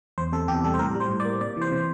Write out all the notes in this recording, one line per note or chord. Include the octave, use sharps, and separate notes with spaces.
E2 C5
C3 A4
E2 G4
G3 A4
C5
A2 A#4
G3
C5
A2
D5
A#3
C3 D5
E3
C5
C3